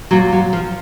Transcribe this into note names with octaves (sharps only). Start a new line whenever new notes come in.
A#2 F#3
F#3
F3